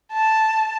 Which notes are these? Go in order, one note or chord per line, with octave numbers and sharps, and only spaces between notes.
A5